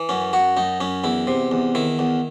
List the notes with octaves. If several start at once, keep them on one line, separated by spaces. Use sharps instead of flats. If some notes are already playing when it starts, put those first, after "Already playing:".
Already playing: E3
F#2 C#4
F#2 F#4
F#2 D#4
F#2 C#4
E2 E4
C3
E2
D#3 E4
E2